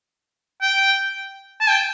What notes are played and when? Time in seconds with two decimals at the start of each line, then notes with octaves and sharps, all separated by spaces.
0.62 G5
1.61 A5
1.69 G5